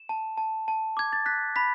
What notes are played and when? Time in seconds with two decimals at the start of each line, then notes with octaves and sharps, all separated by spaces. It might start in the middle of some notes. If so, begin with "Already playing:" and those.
Already playing: E7
0.09 A5
0.38 A5
0.68 A5
0.97 D6 G#6
1.13 A6
1.26 F#6 B6
1.56 B5 B6